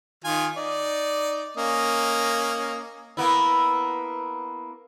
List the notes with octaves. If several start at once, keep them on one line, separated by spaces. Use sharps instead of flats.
D#3 F4 G#5
D#4 D5
A#3 C#4 D#5
A#3 B3 E4